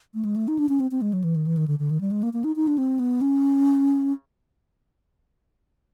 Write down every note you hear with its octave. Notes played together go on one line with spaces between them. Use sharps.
A3
G#3
A3
D#4
D4
C#4
C4
C4
G#3
F#3
E3
D#3
E3
D#3
D3
D3
D#3
G3
G#3
A#3
A#3
D#4
D#4
D4
C4
B3
C#4